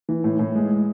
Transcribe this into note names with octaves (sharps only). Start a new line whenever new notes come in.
E3
A2
A2
G#3